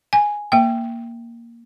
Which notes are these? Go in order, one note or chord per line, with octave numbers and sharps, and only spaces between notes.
G#5
A#3 G5